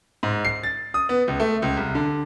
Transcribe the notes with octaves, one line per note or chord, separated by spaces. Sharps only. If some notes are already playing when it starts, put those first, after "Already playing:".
G#2
C7
A6
D#6
B3
C#2
A3
C#2
C2
D3